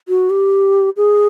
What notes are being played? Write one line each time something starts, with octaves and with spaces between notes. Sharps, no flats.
F#4
G4
G#4